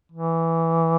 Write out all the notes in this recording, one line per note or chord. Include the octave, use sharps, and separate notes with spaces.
E3